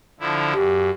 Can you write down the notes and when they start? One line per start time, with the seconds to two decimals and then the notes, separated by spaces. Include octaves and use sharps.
0.20 D3 F3 E4
0.54 F#2 G4